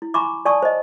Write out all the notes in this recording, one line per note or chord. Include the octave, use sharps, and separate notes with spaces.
E4
G#5 A#5 B5 C#6 D6
D5 G#5 A5 C#6 D#6
C5 D#5